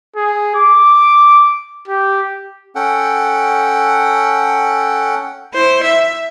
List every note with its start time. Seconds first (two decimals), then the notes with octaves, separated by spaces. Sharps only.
0.16 G#4
0.56 D6
1.88 G4
2.75 C#4 A4 F#5 G5
5.54 E4 C5
5.84 E5